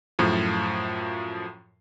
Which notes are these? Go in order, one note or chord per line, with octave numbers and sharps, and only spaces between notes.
F#2 A2 F3